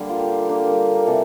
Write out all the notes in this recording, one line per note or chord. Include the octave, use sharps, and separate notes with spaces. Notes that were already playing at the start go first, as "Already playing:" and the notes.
Already playing: D3 G3 A#3
F4
G4
D3 G3 A#3
A#4
C3 E3 A3 A4